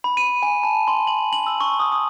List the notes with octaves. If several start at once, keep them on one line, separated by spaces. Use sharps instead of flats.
B5
D#7
G#5
A5
C6
F#7
F#7
E6
C#6
D#6
D#6